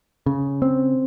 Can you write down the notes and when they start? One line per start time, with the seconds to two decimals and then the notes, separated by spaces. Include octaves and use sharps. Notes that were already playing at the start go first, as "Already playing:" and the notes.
0.26 C#3
0.62 C4